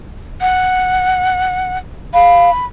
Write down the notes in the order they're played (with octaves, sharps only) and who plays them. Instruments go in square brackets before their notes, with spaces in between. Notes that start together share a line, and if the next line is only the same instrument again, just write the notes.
[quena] F#5
[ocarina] F5 [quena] B5